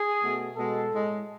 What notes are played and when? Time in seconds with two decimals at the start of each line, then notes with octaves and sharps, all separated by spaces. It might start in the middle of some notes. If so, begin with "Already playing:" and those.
Already playing: G#4
0.21 B2 A3
0.56 B2 G#3 A4
0.91 A2 G#3